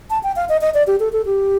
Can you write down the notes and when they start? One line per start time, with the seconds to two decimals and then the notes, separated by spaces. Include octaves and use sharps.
0.10 A5
0.23 G5
0.36 F5
0.49 D#5
0.61 D#5
0.74 D5
0.87 G4
1.00 A4
1.13 A4
1.26 G4